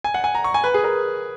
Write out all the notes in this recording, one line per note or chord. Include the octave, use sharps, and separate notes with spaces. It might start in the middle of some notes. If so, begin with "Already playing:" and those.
G#5
F#5
G#5
A#5
C#6
G#5
B4
G#4
A#4